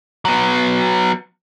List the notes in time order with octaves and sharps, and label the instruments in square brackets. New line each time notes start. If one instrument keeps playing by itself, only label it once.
[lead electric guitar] F#3 B3